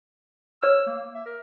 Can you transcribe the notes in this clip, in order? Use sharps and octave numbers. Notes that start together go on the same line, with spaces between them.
C#5 E6 F6
A#3
E5
A#4